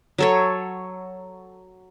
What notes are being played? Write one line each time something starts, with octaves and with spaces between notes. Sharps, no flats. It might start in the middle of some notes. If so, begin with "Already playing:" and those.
F#3 A4 C#5